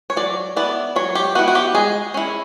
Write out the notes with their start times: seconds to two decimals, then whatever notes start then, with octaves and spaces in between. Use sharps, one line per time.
0.10 C#5
0.17 F#3 D5
0.56 B3 E4 D5
0.96 F#3 C#5
1.15 G4
1.35 B3 E4 F#4
1.48 F#4
1.55 G4
1.75 G#3 G#4
2.14 C#4 E4